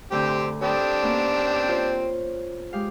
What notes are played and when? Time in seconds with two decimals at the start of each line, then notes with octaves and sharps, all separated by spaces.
0.11 D2 D3 C4 G4
0.62 C4 D4 G4 A4 D#5 B5
1.03 A#3 B3 C#4
1.68 F4 C5 C#5
2.73 G#3 G4 F5